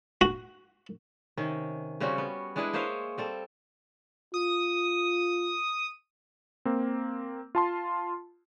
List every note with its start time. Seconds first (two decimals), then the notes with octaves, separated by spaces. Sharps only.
0.21 F#4
1.37 C3 D#3 C#4
2.00 C#3 G3 C4 C#4 F#4
2.18 B3
2.56 G#3 D4 E4 G#4 B4
2.73 G#3 A#3 C5 C#5 E5 F5
3.18 G3 C4 A4
4.34 F4 D#6
6.65 A#3 C4
7.55 F4 A5 C6